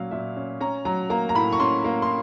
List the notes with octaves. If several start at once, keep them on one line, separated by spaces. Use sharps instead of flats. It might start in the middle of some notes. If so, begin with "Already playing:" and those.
Already playing: A#2 F#3 C#4 F5
A#2 E5
C#4
C#4 A#5
F#3 A#5
A#3 A#5
A#5
A2 B5
C#6
C#4 C6
A#3
C6